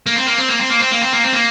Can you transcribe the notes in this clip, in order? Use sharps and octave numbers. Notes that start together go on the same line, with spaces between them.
A#3
C4
A#3
C4
A#3
C4
A#3
C4
A#3
C4
A#3
C4
A#3